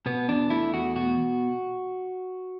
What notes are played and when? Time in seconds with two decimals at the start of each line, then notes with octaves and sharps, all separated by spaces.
0.06 B2 B3
0.28 E2 D4
0.50 A3 E4
0.73 E2 F#4
0.96 B2 F#4